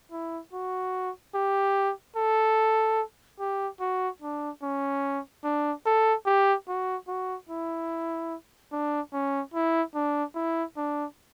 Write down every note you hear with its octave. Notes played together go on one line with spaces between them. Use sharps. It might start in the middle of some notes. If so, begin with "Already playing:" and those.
E4
F#4
G4
A4
G4
F#4
D4
C#4
D4
A4
G4
F#4
F#4
E4
D4
C#4
E4
D4
E4
D4